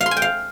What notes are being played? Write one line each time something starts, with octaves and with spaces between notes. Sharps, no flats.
F5
C6
G#5
G5
F5